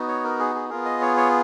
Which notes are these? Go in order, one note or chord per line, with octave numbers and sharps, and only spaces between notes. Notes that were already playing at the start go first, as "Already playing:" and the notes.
Already playing: B3 D#4 F#4
C#5
A#4
G#4
G#4
B3 F4 G#4 A#4
D#5
C#5
C#5